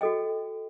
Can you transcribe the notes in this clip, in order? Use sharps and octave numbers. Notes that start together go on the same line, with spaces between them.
F#4 A4 D#5 G5